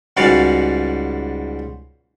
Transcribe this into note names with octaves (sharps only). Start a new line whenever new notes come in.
C#2 G#2 G3 F#4 D5 F5